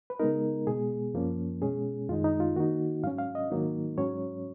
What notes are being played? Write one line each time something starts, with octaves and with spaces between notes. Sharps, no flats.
B4
C#3 G#3 B3 D#4 A#4
B2 G#3 B3 G#4
F#2 F3 A#3 C#4
B2 G#3 C#4 G#4
F#2 D#3 G#3 D#4 F4
D#4
F4
D#3 A#3 D#4 F#4
G#2 F#3 C#4 F5
F5
D#5
G#2 D#3 F#3 A#3 D#4
G#2 F#3 C#4 C#5